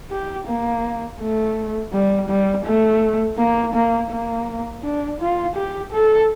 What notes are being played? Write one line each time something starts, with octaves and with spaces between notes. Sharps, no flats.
G4
A#3
A3
G3
G3
A3
A#3
A#3
A#3
D4
F4
G4
A4